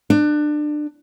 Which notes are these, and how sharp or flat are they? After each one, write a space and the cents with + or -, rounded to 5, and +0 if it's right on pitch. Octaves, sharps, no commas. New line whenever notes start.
D4 +25